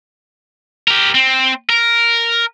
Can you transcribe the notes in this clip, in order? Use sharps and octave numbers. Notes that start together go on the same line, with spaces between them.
G4 A#4
C4
A#4